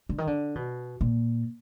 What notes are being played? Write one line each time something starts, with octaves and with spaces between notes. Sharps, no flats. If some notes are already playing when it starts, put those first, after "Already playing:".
D3
D#3
D3
B2
A#2